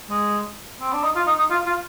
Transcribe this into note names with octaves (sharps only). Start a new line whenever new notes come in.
G#3
C4
D4
D#4
F4
D#4
D#4
F4
F4